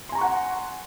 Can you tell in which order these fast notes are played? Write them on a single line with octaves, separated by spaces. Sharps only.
C6 G#5 A#5 C#6 F#5